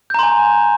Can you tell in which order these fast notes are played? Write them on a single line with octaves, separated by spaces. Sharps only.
G6 A#5 C6 G#5